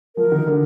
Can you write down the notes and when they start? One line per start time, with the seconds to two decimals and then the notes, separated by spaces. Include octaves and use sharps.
0.16 F3 A#4
0.32 D#3
0.47 D3